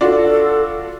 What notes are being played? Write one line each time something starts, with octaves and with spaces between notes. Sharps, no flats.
D4 F4 F#4 A4